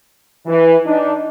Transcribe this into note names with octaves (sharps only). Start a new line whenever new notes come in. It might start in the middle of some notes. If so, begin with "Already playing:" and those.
E3
D4 D#4